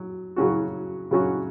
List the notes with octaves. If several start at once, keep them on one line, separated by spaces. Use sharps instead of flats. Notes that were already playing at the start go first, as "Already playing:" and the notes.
Already playing: F#3
C#3 F#3 C#4 F#4
C#3 F#3 C#4 F#4